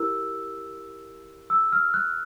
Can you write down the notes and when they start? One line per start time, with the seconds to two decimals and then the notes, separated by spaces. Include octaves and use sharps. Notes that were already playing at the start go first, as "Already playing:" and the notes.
Already playing: E4 G4 A#4 E6
1.50 E6
1.72 F6
1.94 F#6